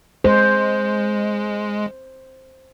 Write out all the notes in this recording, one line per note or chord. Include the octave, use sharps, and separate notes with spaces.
G#3 C5